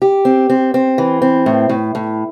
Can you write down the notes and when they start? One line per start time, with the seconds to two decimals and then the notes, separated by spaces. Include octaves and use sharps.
0.02 G4
0.25 C4
0.50 C4
0.74 C4
0.98 E3
1.22 C4
1.46 A2
1.69 A2
1.95 A2